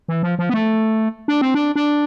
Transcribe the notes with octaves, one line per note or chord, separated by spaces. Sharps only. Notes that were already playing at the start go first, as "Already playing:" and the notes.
E3
F3
F3
B3
A3
D4
C4
D4
D4